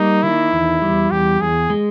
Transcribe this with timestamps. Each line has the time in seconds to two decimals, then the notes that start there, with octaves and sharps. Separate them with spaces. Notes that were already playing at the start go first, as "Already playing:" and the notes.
Already playing: G3 A#3 D#4
0.23 D#3 E4
0.52 E2
0.82 G3
1.11 E2 G4
1.41 E2 G#4
1.70 G#3